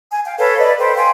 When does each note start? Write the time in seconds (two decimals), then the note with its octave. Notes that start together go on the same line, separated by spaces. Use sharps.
0.11 G#5
0.24 F5 G5
0.38 A4 B4 C#5 F5
0.58 B4 D5 D#5
0.79 A4 B4 C5 G5
0.96 F5 G5 G#5 C6